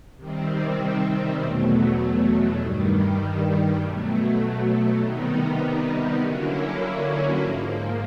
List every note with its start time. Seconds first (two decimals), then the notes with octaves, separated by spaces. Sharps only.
0.17 C3 D#3 G3 C4
1.37 E2 B2 F#3 A3
2.59 G2 D#3 G3
3.79 B2 F#3 A3
5.00 C3 D#3 G3 B3 D#4
6.21 D3 F#3 A#3 C#4 E4
7.41 G#2 F3 A#3